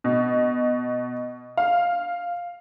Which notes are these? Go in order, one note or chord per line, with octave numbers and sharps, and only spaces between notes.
B2
F5